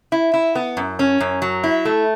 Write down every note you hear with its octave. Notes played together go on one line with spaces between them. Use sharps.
E4
E4
B3
F#2
C#4
F#2
F#3
E4
A3